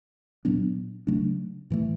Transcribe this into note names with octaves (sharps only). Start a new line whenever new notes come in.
A#2 F#3 B3 D4
C#3 F#3 A3 D4
A2 E3 A3